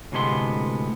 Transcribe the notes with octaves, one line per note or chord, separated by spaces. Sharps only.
D2 A2 C3 G#3 B3 C6